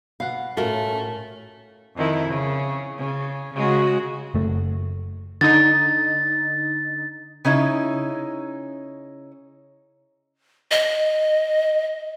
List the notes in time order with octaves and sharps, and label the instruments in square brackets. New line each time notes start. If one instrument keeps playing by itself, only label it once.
[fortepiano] B2 F#5 [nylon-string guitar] F5
[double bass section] A2 C#4 [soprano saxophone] A3 [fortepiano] F4 [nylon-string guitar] F#4 A#4
[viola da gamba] F2 D#3 E4
C#3
C#3
C#3 G#3 F#4
[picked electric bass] F#1 A3
[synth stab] D3 D#4 [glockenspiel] A6
[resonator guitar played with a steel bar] C#3 C#4 D#4 E4
[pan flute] D#5